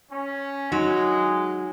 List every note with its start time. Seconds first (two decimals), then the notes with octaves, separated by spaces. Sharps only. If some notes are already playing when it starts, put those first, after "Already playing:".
0.11 C#4
0.72 F#3 G#3 D#4